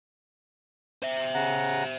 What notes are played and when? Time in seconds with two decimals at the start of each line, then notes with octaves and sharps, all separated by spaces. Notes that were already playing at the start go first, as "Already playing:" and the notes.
1.02 C5 E5
1.35 C#3 F#5 A#5